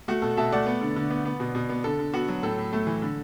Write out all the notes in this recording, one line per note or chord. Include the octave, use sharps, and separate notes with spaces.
A3 F#4
B2 A4
B2 E5 A5
A3 D5 F#5
B3
D3
D3
B3
B3
B2
B2
B3
D3 A4
D3
B3 F#4
F#3
A2 A4
A2
A3
E3
D3